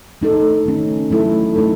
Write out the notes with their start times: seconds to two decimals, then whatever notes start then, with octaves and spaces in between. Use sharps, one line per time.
0.22 A3 D#4 A4
0.66 D#3 A3 C#4
1.10 F#3 A3 E4 A4
1.55 A3 D#4 A4